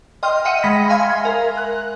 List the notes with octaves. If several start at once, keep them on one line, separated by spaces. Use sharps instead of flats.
D#5 G5 C6 F6
E5 F#5 G5 C#7 D#7
G#3 B5 A#6 B6
E5 F5 G#5 C6 F6 G#6
A#4
F#6